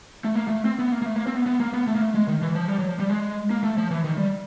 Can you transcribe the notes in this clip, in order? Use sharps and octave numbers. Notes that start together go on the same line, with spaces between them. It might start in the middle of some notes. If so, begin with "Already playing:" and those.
A3
A#3
A3
C4
B3
A#3
A#3
A3
A#3
C4
B3
B3
A#3
B3
A3
A#3
A3
G#3
D#3
E3
F3
G3
F#3
F3
G3
G#3
A#3
A3
F3
E3
D#3
G3